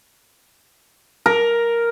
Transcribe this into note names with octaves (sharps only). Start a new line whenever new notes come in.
A#4